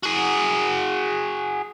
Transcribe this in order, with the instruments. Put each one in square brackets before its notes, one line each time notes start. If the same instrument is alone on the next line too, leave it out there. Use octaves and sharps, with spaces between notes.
[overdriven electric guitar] F#4 G#4